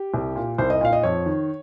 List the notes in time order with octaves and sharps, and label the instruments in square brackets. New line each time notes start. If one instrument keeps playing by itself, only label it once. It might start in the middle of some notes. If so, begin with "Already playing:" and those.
Already playing: [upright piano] G4
C2
A#2
C2 C5
D#5
A#2 F5
D#5
F2 C#5
D#3